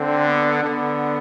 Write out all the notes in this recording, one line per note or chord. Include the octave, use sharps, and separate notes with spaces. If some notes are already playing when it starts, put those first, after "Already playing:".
Already playing: D3 C4
B3
D3 B3